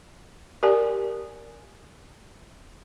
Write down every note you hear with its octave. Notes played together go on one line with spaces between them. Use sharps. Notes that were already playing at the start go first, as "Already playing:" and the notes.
G4 A#4 D5 G#5